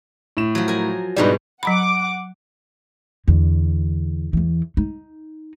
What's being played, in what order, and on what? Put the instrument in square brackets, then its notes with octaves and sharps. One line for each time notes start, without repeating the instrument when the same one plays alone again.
[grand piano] A2 E7
[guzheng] F3 F#3
A#4 G#5
[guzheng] G#2 B2 G3 [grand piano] D4 D#4 B4
[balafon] F#3 A#5 B5 [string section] F#5 D6
[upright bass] E2 D3
E2 E3
D#4